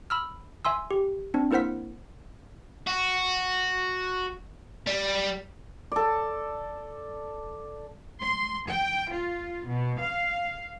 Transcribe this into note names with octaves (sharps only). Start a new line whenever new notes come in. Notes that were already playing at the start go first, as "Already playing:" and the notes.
B5 E6 F6
E5 G#5 C6 E6
G4
C4 D4
A#3 E4 A#4 C5 F#5 B6
F#4
G3
A4 D5
C6
G5
F4
B2
F5